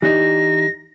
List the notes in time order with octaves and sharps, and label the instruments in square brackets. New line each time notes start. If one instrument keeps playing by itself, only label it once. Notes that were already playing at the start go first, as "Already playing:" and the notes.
[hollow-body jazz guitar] E3 D4 D#4 [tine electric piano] G4 [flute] A#6